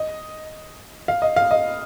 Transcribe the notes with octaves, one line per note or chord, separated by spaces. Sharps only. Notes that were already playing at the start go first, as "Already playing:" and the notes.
Already playing: D#5
F5
D#5
F5
D#5